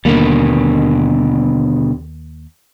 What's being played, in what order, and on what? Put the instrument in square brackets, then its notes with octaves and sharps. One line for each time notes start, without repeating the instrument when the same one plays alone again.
[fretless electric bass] D#2 A#3 [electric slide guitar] B2 D3 G3